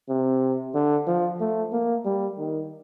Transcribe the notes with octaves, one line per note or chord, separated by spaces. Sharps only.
C3
D3
F3
A3
A#3
G3
D#3